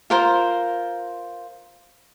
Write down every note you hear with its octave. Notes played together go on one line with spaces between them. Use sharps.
F4 A#4 C5